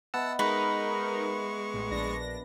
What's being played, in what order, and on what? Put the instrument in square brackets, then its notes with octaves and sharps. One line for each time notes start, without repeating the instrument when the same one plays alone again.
[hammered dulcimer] B3 D#5 E5 [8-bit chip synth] F#5 A5 E6
[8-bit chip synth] G#3 C#6 [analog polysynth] D#4 A#4 [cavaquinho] B4
[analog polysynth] A1
A#1 D4 A#6